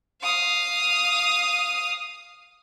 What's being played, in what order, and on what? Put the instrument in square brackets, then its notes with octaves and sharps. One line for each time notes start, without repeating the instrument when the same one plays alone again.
[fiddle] F5 D#6